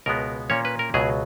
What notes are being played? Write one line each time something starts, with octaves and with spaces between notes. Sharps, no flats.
C#2 B2 G#3 B3 A#4
A#2 A#3 C#4 C#5
B4
A#4
C#2 B2 F#3 G#4